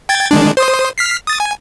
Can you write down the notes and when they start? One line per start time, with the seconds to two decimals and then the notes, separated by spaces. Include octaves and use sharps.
0.09 G5 G#6 A6
0.31 D#3 G#3 D4
0.57 C5 C6 D#6
0.98 F6 B6 C7
1.27 D#6 A6
1.40 G#5